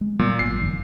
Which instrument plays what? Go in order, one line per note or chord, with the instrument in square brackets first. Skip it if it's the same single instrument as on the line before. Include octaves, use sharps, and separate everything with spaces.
[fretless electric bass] G#3
[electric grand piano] A#2 [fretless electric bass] F#3 G3 B3
[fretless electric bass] G#1 F#3 [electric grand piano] C7
[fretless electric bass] F#1 F2 D#3